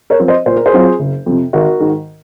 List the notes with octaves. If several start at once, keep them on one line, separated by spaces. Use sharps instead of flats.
A#4 C#5
F3 C4
C5 D#5
A#2 C5
A#4
G#4 C5
F#3 C4 F4
F#1
F2 C3
G#1 F#4 A#4
G#2 D#3